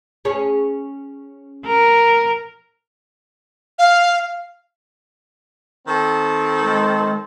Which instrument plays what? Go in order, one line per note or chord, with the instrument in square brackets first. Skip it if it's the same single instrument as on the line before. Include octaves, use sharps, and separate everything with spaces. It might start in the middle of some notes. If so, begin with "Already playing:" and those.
[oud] C#4 G#4 C#5
[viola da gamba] A#4
[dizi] F5
[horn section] D#3 C4 A4
[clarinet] G#3